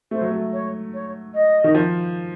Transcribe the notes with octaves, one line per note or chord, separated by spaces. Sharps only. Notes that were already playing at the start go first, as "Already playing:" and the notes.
A3 C5
F#3
A3
C#5
C#5
D#5
D#3
F3